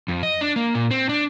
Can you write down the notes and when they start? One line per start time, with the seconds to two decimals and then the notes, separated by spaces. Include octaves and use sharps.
0.08 F2
0.23 D#5
0.41 D4
0.56 A#3
0.75 A#2
0.91 C4
1.09 D4